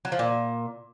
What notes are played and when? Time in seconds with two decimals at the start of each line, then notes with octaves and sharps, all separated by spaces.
0.05 F#3
0.12 F3
0.19 A#2